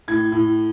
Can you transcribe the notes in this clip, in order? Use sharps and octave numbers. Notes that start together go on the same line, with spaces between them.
A2 G#6
A2